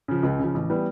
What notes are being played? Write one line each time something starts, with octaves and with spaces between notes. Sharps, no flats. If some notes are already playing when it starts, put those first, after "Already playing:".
C#3 F3
C#2
C#3 F3
A1
E3 G3 B3